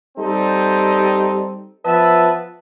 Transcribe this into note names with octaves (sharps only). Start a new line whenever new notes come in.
G3 C4 D#4 G4 A4
F3 B3 B4 E5 A5